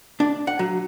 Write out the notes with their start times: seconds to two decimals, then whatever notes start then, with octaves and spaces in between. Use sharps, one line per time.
0.20 D4
0.47 F#5
0.59 F#3